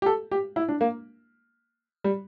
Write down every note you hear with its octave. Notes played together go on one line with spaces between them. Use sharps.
G4
A4
G4
E4
D4
A#3
G3